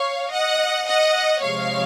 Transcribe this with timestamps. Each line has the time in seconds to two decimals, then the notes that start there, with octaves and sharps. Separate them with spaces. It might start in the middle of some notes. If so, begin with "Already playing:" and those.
Already playing: C#5 F5
0.32 D#5 F#5
0.87 D#5 F#5
1.41 C3 F3 G#3 C#5 F5